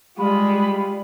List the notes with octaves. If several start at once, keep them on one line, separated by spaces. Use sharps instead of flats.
G3 G#3 F4 B5